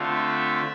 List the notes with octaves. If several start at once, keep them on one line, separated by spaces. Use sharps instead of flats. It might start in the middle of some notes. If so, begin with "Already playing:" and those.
Already playing: D3 A3 C4 F4
E5